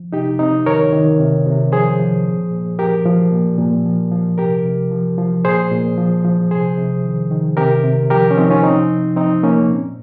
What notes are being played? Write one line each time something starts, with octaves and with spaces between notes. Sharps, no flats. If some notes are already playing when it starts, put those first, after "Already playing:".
Already playing: F3
C3 D#4 G4
C3 C4 D#4
D#3 A#4 C#5
D#3
C3
C3
F3 G#4 C5
F3
A#2
A#2
F3 G4 A#4
F3
A#2
A#2
F3
F3
C3 G4 A#4
C3
F3
F3
A#2 G#4 C5
A#2
F3
F3
C3 G#4 C5
C3
D#3
D#3
C3 G4 A#4
C3
F3 G4 A#4
C#4
F3 C4 D#4
C#4 F4
C3 C4 D#4
C3
F3 C4 D#4
F3 A#3 C#4
A#2